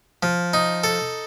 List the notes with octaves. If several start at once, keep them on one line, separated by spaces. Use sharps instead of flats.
F3
D#4
A4